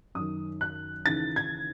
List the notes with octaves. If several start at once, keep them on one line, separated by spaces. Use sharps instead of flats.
F#2 D#3 D#6
F#6
D#2 C#3 E3 A6
G#6